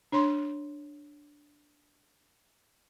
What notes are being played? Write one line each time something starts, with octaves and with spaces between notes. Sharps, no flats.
D4 C#5 C6